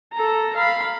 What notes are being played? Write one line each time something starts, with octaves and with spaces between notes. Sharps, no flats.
A4 A#5
F5 B5